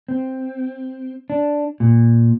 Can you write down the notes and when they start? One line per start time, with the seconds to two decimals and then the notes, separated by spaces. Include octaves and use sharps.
0.08 C4
1.30 D4
1.80 A#2